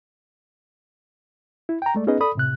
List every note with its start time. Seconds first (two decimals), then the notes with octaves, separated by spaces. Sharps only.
1.69 E4
1.82 G5 A#5
1.95 G#3 A3 D5
2.07 B3 C#4 D#4 G#4 B4 D#5
2.20 A4 D5 B5 D#6
2.35 A2 C3 F#6